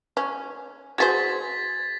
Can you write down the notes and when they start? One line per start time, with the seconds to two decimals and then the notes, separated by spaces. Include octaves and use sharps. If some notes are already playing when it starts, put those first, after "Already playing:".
0.17 C#4
0.98 F#4 G#4 C5 G#6 A6 B6